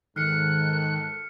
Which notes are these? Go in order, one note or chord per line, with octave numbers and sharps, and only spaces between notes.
G#2 D#3 A4 F6 F#6 C7 C#7